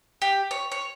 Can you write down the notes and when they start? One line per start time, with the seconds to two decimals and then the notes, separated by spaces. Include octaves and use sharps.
0.22 G4
0.51 C#5
0.72 C#5